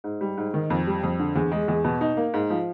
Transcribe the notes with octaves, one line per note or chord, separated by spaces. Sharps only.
G#2
G3
G#2
D#3
F2
G3
F2
D3
E2
G#3
E2
B2
D#4
A#3
G#2
F3